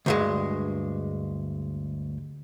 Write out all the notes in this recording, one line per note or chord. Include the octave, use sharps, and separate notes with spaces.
D2 G2 G#3